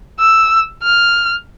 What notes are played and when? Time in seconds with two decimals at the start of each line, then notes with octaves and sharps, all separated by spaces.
0.20 E6
0.84 F6